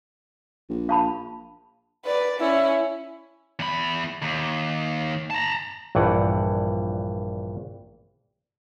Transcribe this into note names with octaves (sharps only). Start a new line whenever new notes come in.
A#1
F5 A5 B5
B4 D5
C#4 E4
E2 B5
D#2
A5 A#5
A#1 G2 E3 F#5